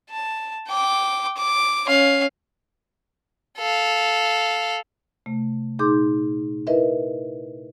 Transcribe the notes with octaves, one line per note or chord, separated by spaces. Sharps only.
A5
G5 D6
D6
C#4 F5
A4 F5
C3 A3
A#2 D#4 G#4 C6 D6 G6
E4 A#4 B4 D#5 E5